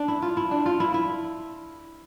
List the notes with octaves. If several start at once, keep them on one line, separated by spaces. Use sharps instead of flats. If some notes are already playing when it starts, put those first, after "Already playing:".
Already playing: D4
E4
F4
E4
D4
F4
E4
E4